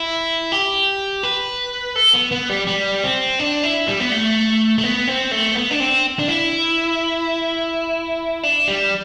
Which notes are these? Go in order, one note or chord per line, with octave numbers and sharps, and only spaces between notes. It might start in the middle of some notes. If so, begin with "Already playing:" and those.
Already playing: E4
G4
B4
A4
B3
B3
G3
G3
C4
D4
E4
G3
B3
A3
A3
B3
C4
A3
B3
D4
C4
D4
E4
D4
G3